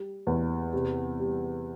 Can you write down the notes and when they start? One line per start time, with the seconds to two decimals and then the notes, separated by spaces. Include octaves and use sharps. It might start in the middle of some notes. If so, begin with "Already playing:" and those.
Already playing: G3
0.27 E2
0.73 C3
1.19 G3